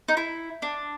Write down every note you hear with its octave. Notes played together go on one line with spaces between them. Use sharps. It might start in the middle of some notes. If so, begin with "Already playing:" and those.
D#4
E4
D4